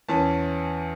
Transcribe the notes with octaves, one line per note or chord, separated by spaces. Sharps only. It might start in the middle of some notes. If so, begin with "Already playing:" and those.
E2 E3 C#4 A5